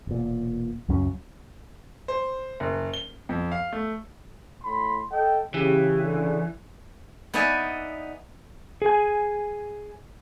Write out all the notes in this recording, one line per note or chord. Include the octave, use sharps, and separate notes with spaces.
E1 A#2
C#2 F#2 F#3 C#4
C5
F#1
G7
F2
F5
A3
A2 B5 C6
A4 D#5 G5
C#3 E3 G4
D3
B3 D#4 B4 D5 E5 G#5
G#4 G#5